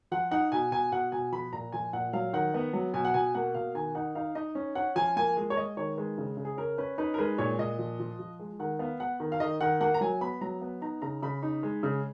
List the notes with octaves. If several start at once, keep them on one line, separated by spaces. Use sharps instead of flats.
F3 F#5
D#4 F#5
B2 G#5
B2 G#5
B2 F#5
B2 G#5
F3 B5
A#2 A#5
F3 G#5
A#2 F#5
F#3 F5
D#3 F#5
B3
F#3
B2 G#5
F#5
B2 G#5
A#3 F#5
B2 F5
D#3 G#5
D#4 F#5
D#4 F5
D#4 D#5
C#4
C#4 F#5
F3 G#5
A#3 G#5
G#3
C#5
G#3 D#5
D#3 C#5
G#3 B4
C#3
C#3
G#4
C#4 A#4
C#4 B4
D#4 B4
A#4
G#3 B4
A#2 C#5
A#2 D#5
F3
F3
F3
G#3
D#3 F#5
B3 F5
B3 F#5
D#3
F5
D#3 D#5
D#3 F#5
A#3 F#5
A#5
F#3 G#5
B3 B5
F#3 A#5
B3
D#4 A#5
C#3 A#5
C#3 B5
D#4
G#3
C#3